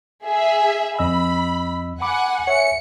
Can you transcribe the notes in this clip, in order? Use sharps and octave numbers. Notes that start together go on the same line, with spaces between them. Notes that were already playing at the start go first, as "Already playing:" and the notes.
G#4 E5
F2 D#5 B5 E6
F#5 G#5 B5 D6
C#5 E5 G#5 C#7